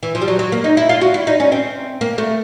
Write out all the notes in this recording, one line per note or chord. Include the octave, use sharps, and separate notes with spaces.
E3
F3
G3
F#3
F#3
A#3
D#4
E4
F4
F#4
E4
D#4
C#4
C4
A#3
A3